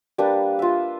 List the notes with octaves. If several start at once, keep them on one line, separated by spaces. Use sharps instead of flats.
G3 A#3 D4 B4
F4 E5